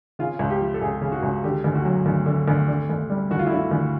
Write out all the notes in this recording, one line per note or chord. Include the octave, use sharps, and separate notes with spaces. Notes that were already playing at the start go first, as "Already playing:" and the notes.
C#3 F4
C#2
G4
F3
A4
C#2 G#4
C#3
F#4
C#2
D3 G4
D2
F#4
F#3
D2
D3
D2
D3
D2
G3
D2 F#4
F4
E4
D3 F4
D2